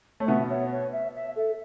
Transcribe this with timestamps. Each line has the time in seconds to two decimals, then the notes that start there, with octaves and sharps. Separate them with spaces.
0.20 A3 C#5
0.28 B2 B3 E5
0.50 C#5
0.72 C#5
0.93 E5
1.15 E5
1.36 A4